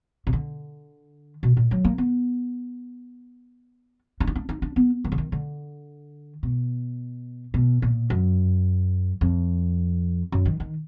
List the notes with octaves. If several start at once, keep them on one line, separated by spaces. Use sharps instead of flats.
B2
D3
B2
A#2
F#3
A#3
B3
D4
D#4
D4
D#4
D4
B3
D#3
D3
D#3
D3
B2
B2
A#2
F#2
F2
F#2
D#3
D#3